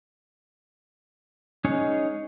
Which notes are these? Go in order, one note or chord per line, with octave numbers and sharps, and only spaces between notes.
G#3 C#4 D#4 G#4 C#5